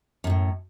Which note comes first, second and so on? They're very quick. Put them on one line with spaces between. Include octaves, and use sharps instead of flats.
F#2 C3 A2